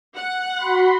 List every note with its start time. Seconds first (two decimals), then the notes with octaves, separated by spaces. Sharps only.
0.16 F#5
0.57 F#4 B5 C6